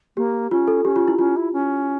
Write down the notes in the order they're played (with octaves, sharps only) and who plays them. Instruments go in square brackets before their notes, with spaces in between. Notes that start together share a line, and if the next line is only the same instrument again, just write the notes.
[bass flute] A#3 [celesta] G4
[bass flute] C#4 [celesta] F4
[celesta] A4
[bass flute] C#4 [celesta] G4
[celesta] F4
E4
[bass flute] C#4 [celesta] F4
[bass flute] E4
C#4